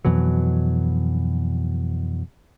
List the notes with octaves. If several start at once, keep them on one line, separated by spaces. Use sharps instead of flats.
F2 B2 E3 F#3